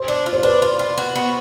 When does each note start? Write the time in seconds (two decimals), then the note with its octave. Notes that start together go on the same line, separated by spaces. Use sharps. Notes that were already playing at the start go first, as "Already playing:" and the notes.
Already playing: C5
0.08 D4
0.26 F4
0.33 C5
0.43 D4 B4
0.62 F4
0.79 F4
0.98 F#4
1.16 B3